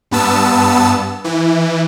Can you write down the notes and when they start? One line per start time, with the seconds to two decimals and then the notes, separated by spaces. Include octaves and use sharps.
0.11 G2 B3 A5 E6
1.24 E3